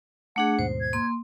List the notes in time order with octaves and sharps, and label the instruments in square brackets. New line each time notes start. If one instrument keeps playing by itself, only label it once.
[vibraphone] A3 D4 G#4 [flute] F#5
[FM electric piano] D#2 G#2 B2 [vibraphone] C5
[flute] G#6
[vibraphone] A#3 C6